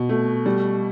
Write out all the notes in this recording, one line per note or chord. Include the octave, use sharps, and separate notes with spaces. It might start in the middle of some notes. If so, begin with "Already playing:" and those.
Already playing: B2
A3
G3